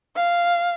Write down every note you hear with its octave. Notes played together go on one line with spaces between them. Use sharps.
F5